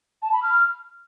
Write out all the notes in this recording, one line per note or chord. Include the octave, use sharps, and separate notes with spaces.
A5
B5
F6